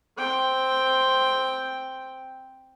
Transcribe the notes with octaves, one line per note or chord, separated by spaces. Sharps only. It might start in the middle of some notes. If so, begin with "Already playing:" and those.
C4 G5